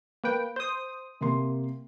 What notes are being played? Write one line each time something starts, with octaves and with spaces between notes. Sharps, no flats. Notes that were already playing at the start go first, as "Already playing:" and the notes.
A#3 B4 G5
C5 D#6
C3 A#3 C6